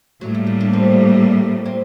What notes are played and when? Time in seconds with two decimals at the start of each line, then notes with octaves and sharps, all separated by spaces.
0.21 A2 F#3 G3 A#3
0.35 A3
0.47 A3
0.61 D4
0.73 C4
1.66 C4